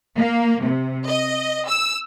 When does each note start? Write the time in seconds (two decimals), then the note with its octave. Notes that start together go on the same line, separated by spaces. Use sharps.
0.18 A#3
0.64 C3
1.08 D#5
1.68 E6